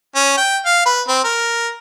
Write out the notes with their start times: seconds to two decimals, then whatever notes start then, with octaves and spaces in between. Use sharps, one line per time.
0.15 C#4
0.37 G5
0.65 F5
0.85 B4
1.08 C4
1.24 A#4